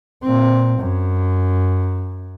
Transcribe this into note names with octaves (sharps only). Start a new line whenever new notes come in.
A#2 C4
F#2